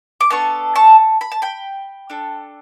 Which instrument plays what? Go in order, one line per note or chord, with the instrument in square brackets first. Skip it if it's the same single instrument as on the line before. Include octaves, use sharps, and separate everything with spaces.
[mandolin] D6
B3 D4 A4 A5 C#6
A5 C#6
B5
A5
G5 B5
D4 A4